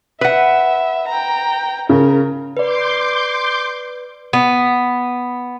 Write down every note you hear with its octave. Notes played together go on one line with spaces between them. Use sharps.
B4 E5 F#5
G5 A#5
C#3 A#4
B4 D5 C6 D6 G6
B3